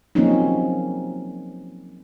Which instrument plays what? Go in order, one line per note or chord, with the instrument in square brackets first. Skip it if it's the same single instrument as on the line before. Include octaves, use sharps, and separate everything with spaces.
[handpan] F3 F#3 A#3 C4 C#4 D#4